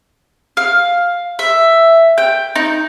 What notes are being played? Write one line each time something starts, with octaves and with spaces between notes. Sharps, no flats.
F5
E5
G5
D#4